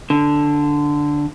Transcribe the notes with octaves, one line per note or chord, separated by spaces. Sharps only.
D3